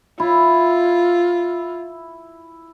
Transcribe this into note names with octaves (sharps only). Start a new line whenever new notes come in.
E4 F4